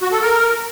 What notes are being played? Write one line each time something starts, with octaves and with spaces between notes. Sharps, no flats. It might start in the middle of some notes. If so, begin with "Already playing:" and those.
F#4
A4
A#4